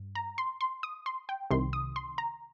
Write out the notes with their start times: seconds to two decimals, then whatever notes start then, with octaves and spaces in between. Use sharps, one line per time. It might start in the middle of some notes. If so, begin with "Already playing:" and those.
Already playing: G2
0.15 A#5
0.38 C6
0.61 C6
0.83 D#6
1.06 C6
1.29 G5
1.51 C2 C3 D#3 C6
1.73 D#6
1.96 C6
2.18 A#5